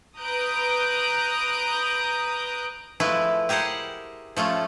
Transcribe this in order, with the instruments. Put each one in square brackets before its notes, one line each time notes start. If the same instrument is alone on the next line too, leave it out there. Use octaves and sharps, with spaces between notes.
[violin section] B4 A#5 D#6 F#6 G6 D7
[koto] F3 G#3 A3 E4 B4
G4 G#4 A#4 C5 F#5
F3 A3 C#4 F4